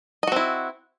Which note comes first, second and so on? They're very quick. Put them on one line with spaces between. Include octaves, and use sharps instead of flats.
D#5 F#4 C4 E4